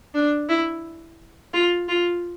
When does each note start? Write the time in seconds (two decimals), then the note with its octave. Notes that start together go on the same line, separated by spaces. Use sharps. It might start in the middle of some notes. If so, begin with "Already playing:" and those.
0.14 D4
0.49 E4
1.53 F4
1.89 F4